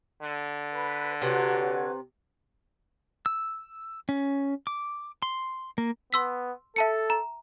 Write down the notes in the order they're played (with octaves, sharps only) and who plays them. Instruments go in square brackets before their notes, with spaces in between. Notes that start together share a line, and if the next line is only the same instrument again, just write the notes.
[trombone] D3
[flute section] B4
[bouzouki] C3 [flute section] F#4 C#5 [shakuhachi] B4
[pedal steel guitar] E6
C#4
D6
C6
A#3
[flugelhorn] B3 [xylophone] C6 E6 B6
[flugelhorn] A4 [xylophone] E5 A5 C#7
[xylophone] A#5